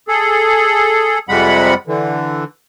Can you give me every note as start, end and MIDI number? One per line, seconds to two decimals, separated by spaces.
0.08 1.18 68
0.08 1.18 69
1.29 1.74 41
1.29 1.74 48
1.29 1.74 55
1.29 1.74 56
1.29 1.74 78
1.29 1.74 83
1.87 2.44 50
1.87 2.44 52